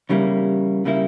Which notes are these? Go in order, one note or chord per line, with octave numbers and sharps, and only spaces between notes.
E2 C#3 G3 A#3 E4
C#3 G3 A#3 E4